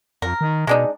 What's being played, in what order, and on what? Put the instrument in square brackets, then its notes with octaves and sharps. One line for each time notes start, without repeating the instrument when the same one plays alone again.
[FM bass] F2 [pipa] A#4
[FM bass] D#3
[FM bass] B2 [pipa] G#3 D4 D#4